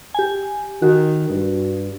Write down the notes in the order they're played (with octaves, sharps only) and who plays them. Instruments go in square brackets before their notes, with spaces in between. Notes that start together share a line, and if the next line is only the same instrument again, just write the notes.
[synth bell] G4 G#5
[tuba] D#3 [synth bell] F#4
[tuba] G2